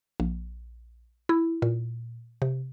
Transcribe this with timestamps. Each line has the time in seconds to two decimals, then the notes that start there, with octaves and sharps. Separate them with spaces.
0.20 A#1
1.29 E4
1.62 A#2
2.42 C3